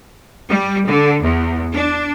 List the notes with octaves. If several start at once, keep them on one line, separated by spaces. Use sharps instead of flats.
G3
D3
E2
D4